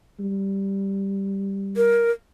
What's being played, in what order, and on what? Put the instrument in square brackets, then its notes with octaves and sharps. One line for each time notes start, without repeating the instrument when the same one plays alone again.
[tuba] G3
[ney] A#4